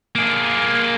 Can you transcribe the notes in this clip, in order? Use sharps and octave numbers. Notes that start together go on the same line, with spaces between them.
A#3 G#4